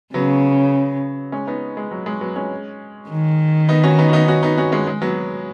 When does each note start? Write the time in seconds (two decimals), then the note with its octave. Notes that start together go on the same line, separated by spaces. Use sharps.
0.14 C#3 F#3 B3
1.32 G#3 C#4
1.47 B3 D#4
1.77 G#3
1.91 F#3
2.06 G#3
2.21 F#3 B3
2.36 G#3 C#4
3.10 D#3
3.69 B3 D#4
3.84 C#4 F#4
3.99 B3 D#4
4.09 F#4
4.13 B3 D#4
4.28 C#4 F#4
4.43 B3 D#4
4.58 C#4 F#4
4.72 G#3 C#4
4.87 G#3
5.02 F#3 B3